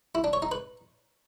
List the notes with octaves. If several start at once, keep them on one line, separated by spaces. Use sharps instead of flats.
E4
D4
C#5
D#4
B4